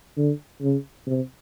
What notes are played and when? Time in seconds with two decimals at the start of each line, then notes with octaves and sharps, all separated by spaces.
0.17 D3
0.62 C#3
1.07 C3